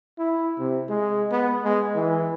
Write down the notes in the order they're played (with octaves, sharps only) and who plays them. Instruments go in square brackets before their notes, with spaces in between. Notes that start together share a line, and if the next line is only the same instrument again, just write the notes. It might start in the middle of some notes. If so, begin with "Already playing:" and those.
[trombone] E4
C3
G#3
B3
G#3
E3